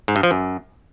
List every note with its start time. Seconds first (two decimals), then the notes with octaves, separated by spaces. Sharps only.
0.08 G#2
0.16 G2
0.23 F3
0.31 F#2